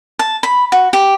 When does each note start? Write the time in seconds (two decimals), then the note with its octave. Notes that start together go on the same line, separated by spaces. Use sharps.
0.19 A5
0.43 B5
0.72 F#4
0.93 G4